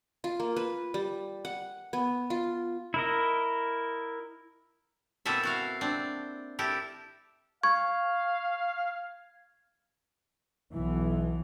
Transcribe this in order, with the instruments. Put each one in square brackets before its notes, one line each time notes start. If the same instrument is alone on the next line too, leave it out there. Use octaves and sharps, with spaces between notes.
[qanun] F4
A#3
B4
G3
F#5
B3
F4
[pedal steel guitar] E4 A#4 D#5
[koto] B2 A#3 C4 E4 A4 E5
E4 F#4 F5
C4 D4
E4 G4 A4 A#4 E5
[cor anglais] F5 [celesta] C#6 [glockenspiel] G#6
[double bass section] B1 E3